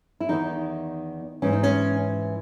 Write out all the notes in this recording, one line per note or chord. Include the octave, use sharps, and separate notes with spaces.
E4
E2 D#3 D#4
G#2 E3 C#4
D#4
C#4